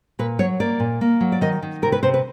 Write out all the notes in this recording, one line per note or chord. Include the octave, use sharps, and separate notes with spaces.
A#2 B4
F#3 C#5
A#3 D5
A#2
A#3
F#3
D5
D#3 D#5
D#3
C3 A#4
B4
C3 C5
B4